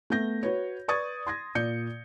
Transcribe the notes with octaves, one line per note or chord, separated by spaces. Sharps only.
A3 B3 G6 A#6
F#4 B4 C#5
B4 D5 C#6 D#6 G#6 A6
C6 G#6 A#6
A#2 D5 G6 C#7